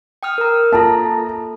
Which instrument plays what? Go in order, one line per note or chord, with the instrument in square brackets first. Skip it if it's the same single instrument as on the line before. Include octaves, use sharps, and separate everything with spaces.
[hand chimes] G5 D#6 F6
A#4 A#5
[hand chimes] A#3 F4 A4 [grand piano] A5 A#5